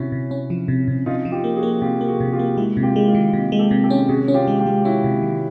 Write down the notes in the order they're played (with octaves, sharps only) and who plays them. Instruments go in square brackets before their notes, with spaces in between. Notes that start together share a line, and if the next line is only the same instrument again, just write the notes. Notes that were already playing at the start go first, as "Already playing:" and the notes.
Already playing: [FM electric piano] C3 C#4 [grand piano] E4 F#4
[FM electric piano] C3
C#4
F3
C3
C3
[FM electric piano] C3 [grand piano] D#4 F4
[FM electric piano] F3
[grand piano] F4 G4
[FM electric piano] A#3
[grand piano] F#4 G#4
[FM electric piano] A#3
[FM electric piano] C3 [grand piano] F4 G4
[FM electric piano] A#3
[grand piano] F#4 G#4
[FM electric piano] C3
[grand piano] F4 G4
[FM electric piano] A#3
[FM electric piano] G#3 [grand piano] E4 F#4
[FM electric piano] C3
[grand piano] F4 G4
[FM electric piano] G#3
[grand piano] D#4 F4
[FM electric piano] D#3
C3
G#3
[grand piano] G4 A4
[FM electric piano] C3
[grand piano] G4 A4
[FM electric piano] C#4
[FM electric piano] C3 [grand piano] F#4 G#4
[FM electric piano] C#4
[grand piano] F4 G4
[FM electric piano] G#3
[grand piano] F4 G4
[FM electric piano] G#3
[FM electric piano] C#4 [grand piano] E4 F#4
[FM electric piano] C3
D#3